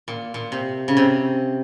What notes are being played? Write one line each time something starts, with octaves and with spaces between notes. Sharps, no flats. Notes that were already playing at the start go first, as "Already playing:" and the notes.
A#2
A#2
C3
C#3
C3